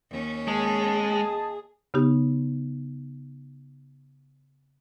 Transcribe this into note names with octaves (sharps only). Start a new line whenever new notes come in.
D#2 C#4
G#3 G#4 D#5 G#5 A5
C#3 B3 D#4 G4